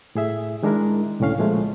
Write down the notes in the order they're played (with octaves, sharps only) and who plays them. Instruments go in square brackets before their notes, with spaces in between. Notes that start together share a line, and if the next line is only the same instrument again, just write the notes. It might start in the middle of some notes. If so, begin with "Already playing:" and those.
[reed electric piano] A2 G#4 E5
D#3 G#3 D4 E4 A#4
C2 A2 D3 C#4 F5
A#2 F3 G#3 A3